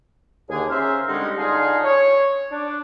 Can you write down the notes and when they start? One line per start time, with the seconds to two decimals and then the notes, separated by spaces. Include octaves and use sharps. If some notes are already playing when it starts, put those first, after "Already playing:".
0.50 D#2 D3 G#4
0.71 C#4 G#4 A#4 C5 E5 F5
1.09 D3 G3 G#3 C4 C#4 D#4
1.37 D3 D4 D#4 F4 G#4
1.85 C#5
2.52 D4